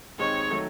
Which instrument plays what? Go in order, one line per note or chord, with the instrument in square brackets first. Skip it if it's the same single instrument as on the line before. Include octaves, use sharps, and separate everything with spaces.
[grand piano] D#2 D#3 G#3 C4 D#4 [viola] C#5
[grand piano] D#3 F#3 A3